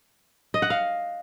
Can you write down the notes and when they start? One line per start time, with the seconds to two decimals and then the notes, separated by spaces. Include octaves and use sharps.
0.54 D#5
0.62 F#5
0.70 F5